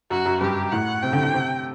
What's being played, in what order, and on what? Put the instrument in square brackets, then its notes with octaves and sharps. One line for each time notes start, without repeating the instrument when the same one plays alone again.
[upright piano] F#2 [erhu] F#4
[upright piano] F#2
[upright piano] G2 [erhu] G4
[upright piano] A2 [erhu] F#5
[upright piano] C3 [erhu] G5
[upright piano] D3
D3
C3